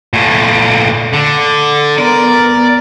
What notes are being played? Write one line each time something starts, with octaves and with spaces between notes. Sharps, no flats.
A#2 A3
D3
B3 A#4 D5